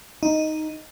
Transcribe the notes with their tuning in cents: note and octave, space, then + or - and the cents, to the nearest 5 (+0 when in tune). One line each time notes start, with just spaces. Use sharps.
D#4 +0